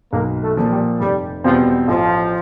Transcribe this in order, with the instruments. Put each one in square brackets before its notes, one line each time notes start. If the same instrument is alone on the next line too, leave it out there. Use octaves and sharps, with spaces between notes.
[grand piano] B1 [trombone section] A#3
[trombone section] A3
[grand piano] A#2 F3
[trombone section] G3
[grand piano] F1 [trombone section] G3
[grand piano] E2 B2 G3 C4 [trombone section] F3
[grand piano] A1 [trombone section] F3